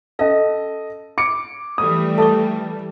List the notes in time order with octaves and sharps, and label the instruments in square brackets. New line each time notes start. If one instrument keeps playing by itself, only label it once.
[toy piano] C#4 F5 [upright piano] A4 D#5
[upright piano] D6 C#7
[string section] E3 G3 A3 [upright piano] D#6
[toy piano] A4 C#6 [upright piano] A5